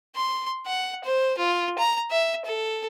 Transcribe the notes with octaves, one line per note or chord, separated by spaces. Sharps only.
C6
F#5
C5
F4
A#5
E5
A4